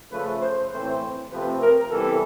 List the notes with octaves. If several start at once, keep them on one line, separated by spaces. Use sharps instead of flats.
C#3 F3 A3 B4
C5
A2 E3 A3 C4 C5
C3 F3 A3 C4 B4
A#4
C3 E3 G3 B3 A4